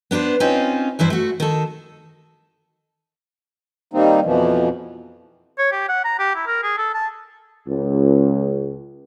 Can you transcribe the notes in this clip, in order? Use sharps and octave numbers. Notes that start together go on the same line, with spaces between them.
B3 D4 A#4 C5
C4 C#4 D#4 F4
G2 E3 E4 C5
A3 F#4
D#3 A4
D#3 G3 A#3 C4 D#4
F2 B2 E3 F3
C#5
G4
F#5
A#5
G4
E4
A#4
G#4
A4
A5
C#2